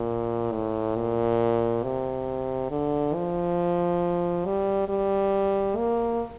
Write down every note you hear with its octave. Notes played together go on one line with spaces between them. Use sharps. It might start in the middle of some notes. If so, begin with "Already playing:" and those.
Already playing: A#2
A2
A#2
C3
D3
F3
G3
G3
A#3